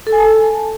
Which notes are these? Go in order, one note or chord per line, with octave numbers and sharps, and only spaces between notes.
A4
G#5
A5
A4